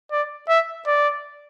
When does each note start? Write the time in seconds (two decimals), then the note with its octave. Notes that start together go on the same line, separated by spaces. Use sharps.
0.11 D5
0.49 E5
0.86 D5